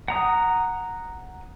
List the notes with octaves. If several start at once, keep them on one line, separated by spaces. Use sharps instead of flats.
F#5 A#5 D#6